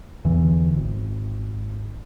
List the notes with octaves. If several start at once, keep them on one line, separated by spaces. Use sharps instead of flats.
E2 D3 E3
G#1